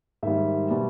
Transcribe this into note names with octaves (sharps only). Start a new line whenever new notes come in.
G#2 D#3 G3 E5
B2 G3